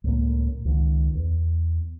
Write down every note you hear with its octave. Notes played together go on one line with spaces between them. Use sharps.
C#2 A2 A#3
C#2 D#3
E2